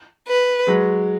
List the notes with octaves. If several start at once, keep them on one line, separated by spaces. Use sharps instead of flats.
B4
F#3 G#3